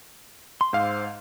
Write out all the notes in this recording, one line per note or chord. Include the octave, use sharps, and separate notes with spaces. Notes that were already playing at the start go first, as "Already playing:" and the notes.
C6
G#2 C5 F5 D6 E6